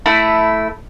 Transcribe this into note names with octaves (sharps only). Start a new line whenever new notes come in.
A3 E4 E5